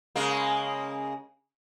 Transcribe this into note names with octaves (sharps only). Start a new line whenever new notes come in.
C#3 G#3 A#3